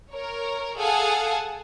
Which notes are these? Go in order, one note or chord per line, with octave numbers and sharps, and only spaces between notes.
A#4 C#5
G#4 A4 F5 F#5 G#5 A5